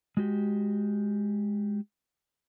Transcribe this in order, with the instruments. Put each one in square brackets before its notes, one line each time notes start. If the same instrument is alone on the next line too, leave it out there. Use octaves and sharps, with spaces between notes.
[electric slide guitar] G#3 F#4 G4